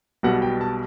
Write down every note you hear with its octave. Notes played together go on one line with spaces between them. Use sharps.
B1 B2 G3 F#5
G5
A5